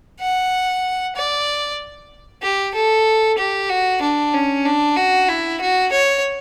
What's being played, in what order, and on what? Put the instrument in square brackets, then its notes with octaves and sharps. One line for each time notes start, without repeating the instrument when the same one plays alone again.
[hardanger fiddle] F#5
D5
G4
A4
G4
F#4
D4
C#4
D4
F#4
E4
F#4
C#5